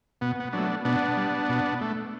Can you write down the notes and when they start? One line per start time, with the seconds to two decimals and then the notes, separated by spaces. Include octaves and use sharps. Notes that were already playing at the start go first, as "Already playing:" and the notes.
0.21 B2 B3
0.40 B3
0.53 F#3 A3 B3 D4
0.85 B2 B3 D4
1.17 G3
1.49 B2
1.81 A3